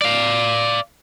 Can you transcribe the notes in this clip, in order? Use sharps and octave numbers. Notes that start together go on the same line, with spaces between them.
D5 F5